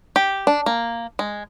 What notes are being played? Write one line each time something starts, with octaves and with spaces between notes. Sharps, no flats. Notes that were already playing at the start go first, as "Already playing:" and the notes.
G4
D4
A#3
G#3